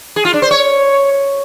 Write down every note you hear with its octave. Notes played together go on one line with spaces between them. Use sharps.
G#4
F4
D4
C5
C#5